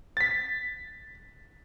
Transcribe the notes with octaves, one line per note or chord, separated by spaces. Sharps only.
A6 B6